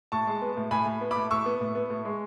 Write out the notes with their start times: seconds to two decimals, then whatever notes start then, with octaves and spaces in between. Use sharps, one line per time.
0.12 A2 A5 C#6
0.27 G#3
0.42 B3
0.57 A2
0.71 A2 G#5 B5
0.86 A2
1.01 B3
1.11 A2 B5 D6
1.31 A2 C#6 E6
1.46 B3
1.61 A2
1.75 B3
1.90 A2
2.05 G#3